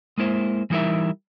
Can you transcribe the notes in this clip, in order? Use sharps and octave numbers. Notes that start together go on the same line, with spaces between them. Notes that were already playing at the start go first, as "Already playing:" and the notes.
G#3 A#3 E4 C5
E3 G3 D#4 E4 A#4 E5